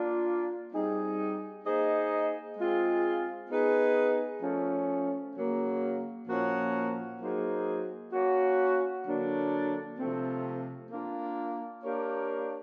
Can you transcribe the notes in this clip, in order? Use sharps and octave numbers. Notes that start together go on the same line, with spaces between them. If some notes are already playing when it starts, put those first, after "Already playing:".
Already playing: A#3 D4 F4
G3 C4 D#4 G#4
A#3 D#4 G#4 C5 D#5
G#3 C4 F4 G#4
B3 D#4 G#4 B4
F3 A3 C#4
C#3 F#3 A#3
A#2 F3 A#3 C#4 F#4
F#3 A#3 D#4 G#4 C5
A#3 C#4 F#4
D3 F#3 A#3 D4
C3 F3 A3 C4
A#3 D4 F4
A#3 D4 G4 A#4 C#5